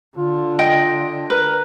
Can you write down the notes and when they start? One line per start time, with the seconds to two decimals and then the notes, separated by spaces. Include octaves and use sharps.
0.17 D3 F4
0.59 D#5 G5
1.30 A#4 B4